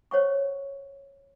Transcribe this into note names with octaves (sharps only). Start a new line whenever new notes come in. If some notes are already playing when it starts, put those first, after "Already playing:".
C5 C#5 F#5 C#6